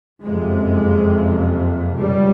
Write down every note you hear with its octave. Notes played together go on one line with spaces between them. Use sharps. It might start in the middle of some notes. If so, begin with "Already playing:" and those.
F#1 F2 C3 G#3
C#2 B2 G3